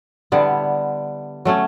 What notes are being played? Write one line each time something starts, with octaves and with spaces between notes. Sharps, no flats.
D3 G3 B3 E4
F#3 A3 C#4